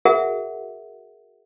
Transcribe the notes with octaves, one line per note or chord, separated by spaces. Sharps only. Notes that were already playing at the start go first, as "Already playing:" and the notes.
F#4 G#4 A#4 E5 F#5